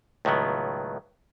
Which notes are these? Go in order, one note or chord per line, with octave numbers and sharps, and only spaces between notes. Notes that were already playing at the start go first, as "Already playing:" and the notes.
C#2 A2 D#3 F#3 B3